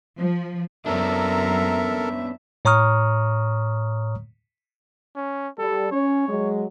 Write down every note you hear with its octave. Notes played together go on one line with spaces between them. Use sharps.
F3
F#2 B3 C#4 D4 A4 A#4 E5 A#5
A2 C#5 A#5 C#6 D#6 F6
C#4
G3 A4
C#4 C#5
F#3 G#3